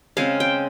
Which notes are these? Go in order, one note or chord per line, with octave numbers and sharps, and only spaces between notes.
C#3 G#3 C4 F5
G5